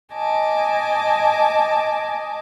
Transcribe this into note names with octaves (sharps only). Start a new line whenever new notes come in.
D#5 G#5 A5 D6